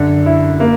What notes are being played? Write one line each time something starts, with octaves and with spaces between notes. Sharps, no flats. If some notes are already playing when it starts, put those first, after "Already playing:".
Already playing: F#2 D3
E4
A#3